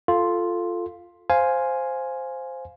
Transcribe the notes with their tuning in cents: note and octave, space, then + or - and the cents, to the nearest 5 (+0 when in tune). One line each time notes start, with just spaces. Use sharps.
F4 +0 A4 +0
C5 +0 F5 +0 G#5 +0